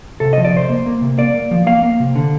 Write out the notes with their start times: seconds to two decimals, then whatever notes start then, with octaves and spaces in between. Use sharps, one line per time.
0.20 C3 A4
0.33 F3 D#5
0.45 D5
0.53 C3 C5
0.69 A#3
0.86 A#3
1.01 C3
1.18 A#3 D5
1.34 A#3
1.51 F3
1.67 A#3 F5
1.83 A#3
2.00 C3
2.16 D3